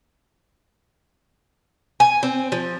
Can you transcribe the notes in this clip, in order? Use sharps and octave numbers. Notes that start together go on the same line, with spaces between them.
G#5
C4
F3